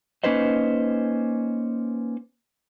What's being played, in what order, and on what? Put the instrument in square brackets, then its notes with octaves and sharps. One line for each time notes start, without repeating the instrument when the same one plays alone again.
[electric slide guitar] A#3 C#4 D#4 B4 C5 D#5